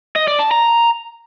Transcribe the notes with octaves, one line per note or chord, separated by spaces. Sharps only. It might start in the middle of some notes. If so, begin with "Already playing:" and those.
D#5
D5
A5
A#5